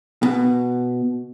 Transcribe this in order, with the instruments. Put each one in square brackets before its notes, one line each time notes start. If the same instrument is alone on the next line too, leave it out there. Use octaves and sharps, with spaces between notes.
[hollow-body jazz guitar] B2